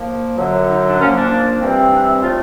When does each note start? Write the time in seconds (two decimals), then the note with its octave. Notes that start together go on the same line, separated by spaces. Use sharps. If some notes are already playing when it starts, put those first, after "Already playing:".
Already playing: A#2 F3 A#3
0.38 F#2 D3 F#3
0.69 D#4
0.89 D4
0.98 A#2 F3 A#3 C#4
1.14 D4
1.60 C3 E3 G3 C4
1.91 D4
2.07 E4
2.21 A2 F3 A3 C4 F4